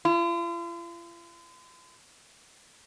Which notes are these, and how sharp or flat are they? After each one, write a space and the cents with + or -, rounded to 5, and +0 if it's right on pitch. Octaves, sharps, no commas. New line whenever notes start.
F4 -45